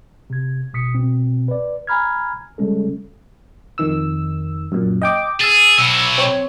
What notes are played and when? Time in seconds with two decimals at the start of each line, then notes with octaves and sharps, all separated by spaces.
0.30 C3 G#6
0.73 G1 B2 D#6 B6 C#7
0.94 C2 B2 C4
1.48 B4 D5
1.87 G#5 A#5 B5 F6 G#6
2.58 C#3 G3 G#3 C#4 A4
3.78 F2 D#3 E6
4.72 F#2 A#2
5.02 D#5 G5 D6
5.41 G#4 E6 A6
5.78 B2 F#3 E6
6.18 C4 C#5